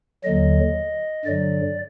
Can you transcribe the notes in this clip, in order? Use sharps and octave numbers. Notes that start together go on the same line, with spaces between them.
D#2 D3 F#3 D#5
G2 D3 F#3 D5